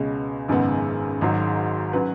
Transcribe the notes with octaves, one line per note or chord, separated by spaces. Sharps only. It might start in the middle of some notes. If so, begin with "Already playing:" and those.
Already playing: C#2 B2 G#3 C#4
G#1 F#2 C#3 G#3 B3
G#1 G#2 F#3
F#3 C#4 B4